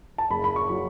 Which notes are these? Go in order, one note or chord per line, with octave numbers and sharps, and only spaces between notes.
A5
F#1 B5
B5
C#6
F#3